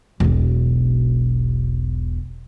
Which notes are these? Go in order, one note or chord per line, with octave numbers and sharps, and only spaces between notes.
E1 B1